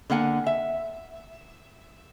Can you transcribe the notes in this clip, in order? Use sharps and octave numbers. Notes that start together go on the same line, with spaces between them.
D3 A#3 F#5 G#5
E5